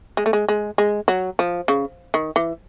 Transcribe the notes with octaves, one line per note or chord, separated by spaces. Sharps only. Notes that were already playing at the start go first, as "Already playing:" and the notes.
G#3
A3
G#3
G#3
G#3
F#3
F3
C#3
D#3
E3